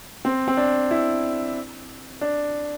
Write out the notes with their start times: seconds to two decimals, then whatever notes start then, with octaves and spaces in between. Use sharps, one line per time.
0.25 C4
0.48 C4
0.57 D4
0.91 E4
2.21 D4